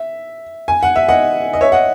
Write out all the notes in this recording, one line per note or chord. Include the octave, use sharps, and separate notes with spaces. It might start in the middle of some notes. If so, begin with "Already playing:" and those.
Already playing: E5
G#5
F#5
E5
D#5 F#5
D#5
C#5 E5
D#5 F#5